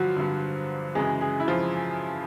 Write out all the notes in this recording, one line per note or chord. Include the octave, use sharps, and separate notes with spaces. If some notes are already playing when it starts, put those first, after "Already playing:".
Already playing: G2 D3 F3 F#3 F4 F#4
G2 D3
F#2 C#3 E3 G#3 G#4
G#3 G#4
E4
F3 F4